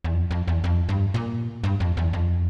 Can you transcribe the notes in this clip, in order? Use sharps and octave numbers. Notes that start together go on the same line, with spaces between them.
E2
F2
F2
E2
F2
G2
A#2
G2
F2
E2
F2